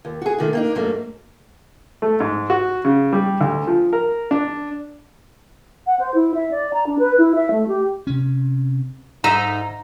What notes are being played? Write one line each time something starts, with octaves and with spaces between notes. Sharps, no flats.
D#2
F#4 G#4
A#2 D#3 A3
A#3 D4 D#4
G#2 F#3 A3 A#3
A3
G#2
F#4
C#3
G3
D2
F3
A#4
D4
F#5
C5
E4
E5
D5
A#5
D4
B4
E4
E5
A3
G4
C3 C#4
G#2 D#4 E5 A#5